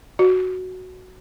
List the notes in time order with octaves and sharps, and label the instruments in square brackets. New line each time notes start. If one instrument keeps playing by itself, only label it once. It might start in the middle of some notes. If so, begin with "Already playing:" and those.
[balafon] F#4